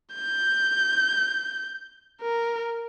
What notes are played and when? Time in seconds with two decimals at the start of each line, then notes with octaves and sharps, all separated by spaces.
0.16 G6
2.22 A#4